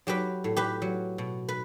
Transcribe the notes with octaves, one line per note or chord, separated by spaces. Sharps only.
F#3 G4 B4
A2
G4 B4
F#3
B2
B4